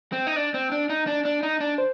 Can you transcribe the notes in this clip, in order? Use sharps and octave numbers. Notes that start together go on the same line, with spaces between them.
C4
D#4
D4
C4
D4
D#4
D4
D4
D#4
D4
C5